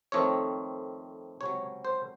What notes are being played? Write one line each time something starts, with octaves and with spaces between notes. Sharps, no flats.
F2 D#3 A3 C4 C#5
C#2 C3 F#3 C#5
C5